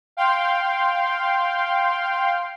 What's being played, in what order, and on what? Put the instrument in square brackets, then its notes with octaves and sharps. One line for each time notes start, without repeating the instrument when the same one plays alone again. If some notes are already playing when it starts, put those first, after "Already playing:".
[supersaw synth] F5 G5 C6